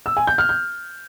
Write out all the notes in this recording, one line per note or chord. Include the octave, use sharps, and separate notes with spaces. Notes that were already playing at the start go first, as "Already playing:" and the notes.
E6
G#5
G6
F6
G6